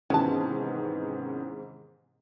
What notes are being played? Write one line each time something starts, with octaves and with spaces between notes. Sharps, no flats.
G#2 C3 D#3 E3 F#3 B3 C#4 A5